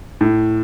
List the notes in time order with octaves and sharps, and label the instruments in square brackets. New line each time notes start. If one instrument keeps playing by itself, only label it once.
[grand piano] A2